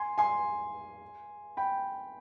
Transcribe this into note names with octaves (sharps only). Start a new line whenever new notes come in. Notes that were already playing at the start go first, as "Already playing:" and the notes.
Already playing: G#5 C6
G#5 C6
G5 B5